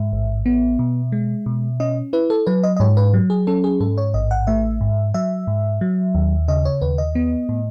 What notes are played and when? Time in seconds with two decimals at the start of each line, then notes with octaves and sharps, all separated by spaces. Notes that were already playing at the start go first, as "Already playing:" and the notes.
Already playing: G#2 E5
0.13 A1
0.46 B3
0.79 B2
1.12 G#3
1.46 B2
1.80 C#4 D#5
2.13 E4 B4
2.30 A4
2.47 F#3 B4
2.63 D#5
2.76 D#5
2.80 G#2 C#5
2.97 B4
3.14 F#3
3.30 G#4
3.47 C#4 A4
3.64 G#4
3.80 G#2 A4
3.98 C#5
4.14 A1 D#5
4.31 F#5
4.47 A3 E5
4.81 G#2
5.14 F#3 E5
5.47 G#2
5.81 F#3
6.15 D#2
6.48 C#3 D#5
6.65 C#5
6.82 D#2 B4
6.98 D#5
7.15 B3
7.49 A2